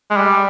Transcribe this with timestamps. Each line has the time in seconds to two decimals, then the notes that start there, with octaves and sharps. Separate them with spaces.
0.10 G#3
0.17 G3